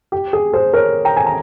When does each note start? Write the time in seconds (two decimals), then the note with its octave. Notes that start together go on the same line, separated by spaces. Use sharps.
0.12 G4
0.33 G#4
0.53 G#4 C5
0.73 A#4 C#5
1.05 G5 A#5
1.17 G#5
1.26 A#5